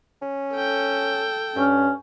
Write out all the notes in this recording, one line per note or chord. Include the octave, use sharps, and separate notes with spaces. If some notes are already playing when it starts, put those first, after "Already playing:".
C#4
A4 G5
G2 C#4